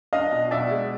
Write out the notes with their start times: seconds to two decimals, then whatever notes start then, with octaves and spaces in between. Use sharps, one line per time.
0.13 D4 D#5 F5
0.31 B2
0.51 B2 D5 E5
0.71 G#3